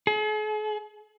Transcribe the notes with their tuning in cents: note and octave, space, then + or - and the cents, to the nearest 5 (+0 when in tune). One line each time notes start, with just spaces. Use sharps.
G#4 +45